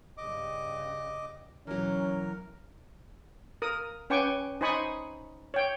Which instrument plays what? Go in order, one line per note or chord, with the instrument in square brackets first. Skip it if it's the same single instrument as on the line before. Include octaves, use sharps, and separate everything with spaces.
[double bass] G2 C#3 [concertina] D#5 D6
[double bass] B2 [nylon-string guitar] E3 F#3 [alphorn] C#4 [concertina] A#4
[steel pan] A#4 D#6
C#4 B4 G5 G#5 C#6 D6
D#4 C5 G#5 B5 C#6 D#6
C#5 G5